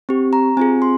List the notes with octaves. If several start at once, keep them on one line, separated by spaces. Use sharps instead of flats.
C4 G4
A#5
C4 F4 G#4 G#5
C6